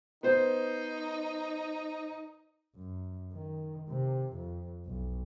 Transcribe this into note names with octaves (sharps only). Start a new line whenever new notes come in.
B3 D#4 C5
F#2
D#3
C3
F2
B1